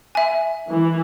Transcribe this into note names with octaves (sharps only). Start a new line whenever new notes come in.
E5 G#5
E3